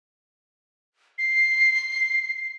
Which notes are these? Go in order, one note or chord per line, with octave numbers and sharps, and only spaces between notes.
C7